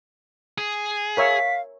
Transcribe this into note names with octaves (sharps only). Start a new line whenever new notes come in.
G#4
A#4 C#5 E5 F5 B6